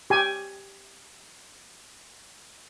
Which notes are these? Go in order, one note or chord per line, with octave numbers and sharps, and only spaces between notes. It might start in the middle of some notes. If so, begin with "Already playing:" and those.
G4 G#5